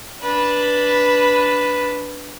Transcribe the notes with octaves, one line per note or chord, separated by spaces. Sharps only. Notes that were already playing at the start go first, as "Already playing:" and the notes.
D4 B4